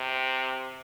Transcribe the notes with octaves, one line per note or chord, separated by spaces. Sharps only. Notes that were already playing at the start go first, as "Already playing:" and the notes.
Already playing: C3